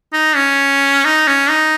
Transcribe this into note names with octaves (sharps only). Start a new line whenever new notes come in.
D#4
C#4
D#4
C#4
D#4